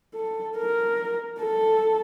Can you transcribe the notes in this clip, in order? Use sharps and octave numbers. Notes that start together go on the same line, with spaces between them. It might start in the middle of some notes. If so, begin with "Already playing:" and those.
A4
A#4
A4